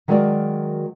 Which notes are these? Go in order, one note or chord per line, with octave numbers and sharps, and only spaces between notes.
D#3 F#3 G#3 F#4 A#4 D5